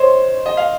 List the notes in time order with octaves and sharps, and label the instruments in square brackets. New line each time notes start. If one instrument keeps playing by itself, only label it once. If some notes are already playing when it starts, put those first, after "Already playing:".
Already playing: [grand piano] C5 C#5 D#5
D#5
F5